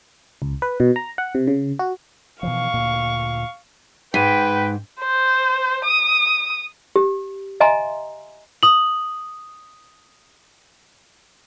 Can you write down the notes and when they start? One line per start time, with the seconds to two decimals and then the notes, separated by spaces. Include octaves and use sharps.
0.42 C#2
0.62 B4
0.80 B2
0.96 A#5
1.18 F#5
1.35 C3
1.47 C#3
1.79 F#4
2.43 B2 E3 F3 F5 C#6
2.74 D2 A#2
4.14 G#2 B4 G5 B6 D#7
5.00 C5
5.85 D#6
6.96 G4
7.60 D#5 E5 G#5 A#5 C6
8.63 D#6 F#7